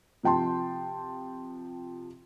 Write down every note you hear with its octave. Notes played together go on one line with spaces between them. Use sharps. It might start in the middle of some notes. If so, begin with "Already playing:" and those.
C3 F3 G5 A5 C6